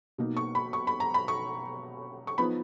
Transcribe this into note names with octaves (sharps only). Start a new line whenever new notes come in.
B2 A#3 D#4
C#6
B5
C#6
B5
A#5
B5
C#6
C#6
F3 B3 D#4 B5